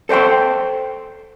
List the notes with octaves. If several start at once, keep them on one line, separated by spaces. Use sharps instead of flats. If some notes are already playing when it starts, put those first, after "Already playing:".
A4 C5 D5 G5 C6